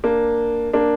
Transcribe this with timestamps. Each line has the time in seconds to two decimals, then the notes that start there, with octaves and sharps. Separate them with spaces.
0.04 A#3 D4
0.73 A#3 D4